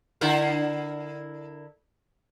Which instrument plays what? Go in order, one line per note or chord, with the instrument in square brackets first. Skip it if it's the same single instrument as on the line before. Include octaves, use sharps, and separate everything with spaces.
[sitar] D3 E4 A#4